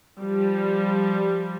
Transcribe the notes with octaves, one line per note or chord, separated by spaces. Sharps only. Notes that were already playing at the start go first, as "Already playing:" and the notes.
F3 G3